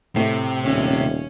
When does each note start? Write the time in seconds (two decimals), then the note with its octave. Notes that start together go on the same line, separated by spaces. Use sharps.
0.16 A2 C3 A3
0.63 D#1 C#4